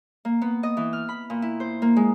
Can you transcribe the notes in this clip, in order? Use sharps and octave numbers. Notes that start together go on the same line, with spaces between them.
A#3
B3
D#5
E3
F6
B5
A#2
E4
C5
A#3
G#3